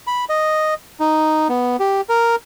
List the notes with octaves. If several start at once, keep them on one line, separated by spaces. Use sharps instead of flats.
B5
D#5
D#4
B3
G4
A#4